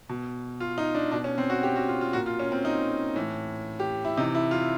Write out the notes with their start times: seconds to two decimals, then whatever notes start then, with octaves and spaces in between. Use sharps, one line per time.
0.09 B2
0.60 F4
0.78 D#4
0.95 D4
1.12 B2 D4
1.24 C#4
1.38 C4
1.50 F#4
1.63 G4
1.76 F#4
1.88 F4
2.01 F4
2.13 A#2 F#4
2.26 F4
2.39 C#4
2.52 C4
2.65 D#4
3.16 A2 E3
3.80 G4
4.05 E4
4.17 C3 D#4
4.22 E3
4.35 E4
4.51 F4